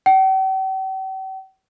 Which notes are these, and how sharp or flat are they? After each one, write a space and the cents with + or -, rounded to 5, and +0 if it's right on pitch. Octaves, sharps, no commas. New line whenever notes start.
G5 -45